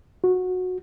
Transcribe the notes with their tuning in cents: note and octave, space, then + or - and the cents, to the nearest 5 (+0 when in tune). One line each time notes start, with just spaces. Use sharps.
F#4 -15